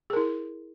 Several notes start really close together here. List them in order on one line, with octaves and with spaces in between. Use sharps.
G#4 A#4 E4